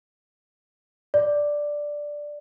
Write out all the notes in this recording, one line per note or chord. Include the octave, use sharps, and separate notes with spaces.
D5